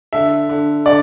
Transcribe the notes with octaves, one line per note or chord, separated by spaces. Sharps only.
D3 E5
D3
D3 D5